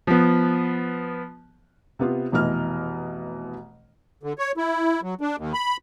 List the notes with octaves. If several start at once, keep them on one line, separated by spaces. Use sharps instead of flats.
F3 B3
C3 B3 F4
F1 B2 E3 D#5 F6
D3
C#5
E4
F#3
D4
D#2
B5